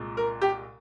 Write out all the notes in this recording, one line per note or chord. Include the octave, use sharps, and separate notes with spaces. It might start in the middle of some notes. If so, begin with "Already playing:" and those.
Already playing: C2 A#2 G#3
A#4
G4